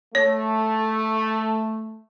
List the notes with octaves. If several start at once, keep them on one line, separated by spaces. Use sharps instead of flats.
A3 C#5